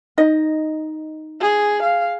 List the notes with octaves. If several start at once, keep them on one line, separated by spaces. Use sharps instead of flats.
D#4 D#5
G#4
F5